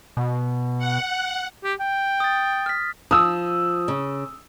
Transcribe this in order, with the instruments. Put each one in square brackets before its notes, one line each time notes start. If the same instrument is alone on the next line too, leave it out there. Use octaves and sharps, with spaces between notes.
[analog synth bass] B2
[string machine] F#5
[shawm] G4
G5
[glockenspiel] D#6 A6
F6 B6
[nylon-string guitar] F3 [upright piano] D#6 E6
[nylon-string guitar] C#3